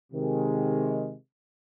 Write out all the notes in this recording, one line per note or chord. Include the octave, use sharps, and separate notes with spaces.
C3 D#3 G#3